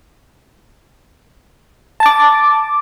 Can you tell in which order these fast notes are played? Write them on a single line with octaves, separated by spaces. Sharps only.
A5 A6 D6